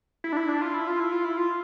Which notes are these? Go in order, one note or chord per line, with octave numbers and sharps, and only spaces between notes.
E4
D4
E4
D4
F4
E4
F4
E4
F4
E4
F4